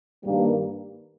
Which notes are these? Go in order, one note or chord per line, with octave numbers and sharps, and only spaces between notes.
G2 D#3 G3 A#3